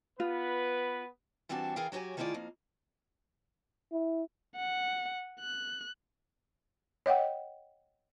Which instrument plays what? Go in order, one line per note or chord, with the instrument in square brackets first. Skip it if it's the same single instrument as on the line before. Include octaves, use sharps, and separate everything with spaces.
[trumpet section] B3 B4 [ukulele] F4
[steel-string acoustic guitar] E3 G3 C4 D4 F#4 A5
E3 G#4 A#4 D5 F5 G5
F#3 F#4 G4 C#5 G#5
D#3 A3 E4 F4 G#4 D5
F2 A#3
[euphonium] E4
[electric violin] F#5
F#6
[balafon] C#5 D#5 F#5 G5